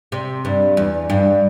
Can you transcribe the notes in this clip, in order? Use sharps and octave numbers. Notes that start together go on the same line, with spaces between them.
C3
G2
E2
G2